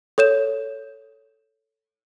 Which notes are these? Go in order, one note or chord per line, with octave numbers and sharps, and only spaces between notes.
A4 C#5 G6 E7